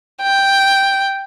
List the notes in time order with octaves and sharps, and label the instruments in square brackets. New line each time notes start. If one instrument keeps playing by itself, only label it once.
[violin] G5